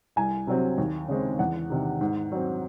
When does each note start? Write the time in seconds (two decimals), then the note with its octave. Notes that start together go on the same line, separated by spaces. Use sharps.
0.16 C2 G#5
0.47 C3 F#3 C4
0.78 D#2
1.08 C#3 G#3 C4
1.39 E2 F#5
1.70 C3 D#3
2.01 G#2
2.32 F#3 C4